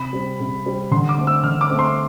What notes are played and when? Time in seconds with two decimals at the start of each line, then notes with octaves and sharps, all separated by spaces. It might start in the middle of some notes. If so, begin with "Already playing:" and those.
Already playing: C3 B5
0.13 G3 C4
0.40 C3
0.66 G3 C4
0.91 D3 C6
1.09 D6
1.18 A3 C4
1.27 E6
1.44 D3 F6
1.61 D6
1.70 A3 C4
1.79 C6